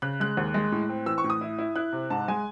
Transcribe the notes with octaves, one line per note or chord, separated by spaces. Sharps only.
C#3 F#6
G#3 F#6
D#2
G#3
A2
C4
E3 E6
C#6
A2
D#6
E4
E4
E4 F#6
C3
G#2 A5
G#3 G#5